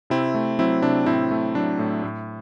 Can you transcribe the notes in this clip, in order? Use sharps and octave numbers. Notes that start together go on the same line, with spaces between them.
C3 C4 E4
A3
F#3 C4 E4
C3 D4
A2 C4 E4
A3
F#3 D4
A2
A2